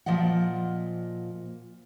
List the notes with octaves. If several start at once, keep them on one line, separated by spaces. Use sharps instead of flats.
A#2 F3 D5 D#5 F#5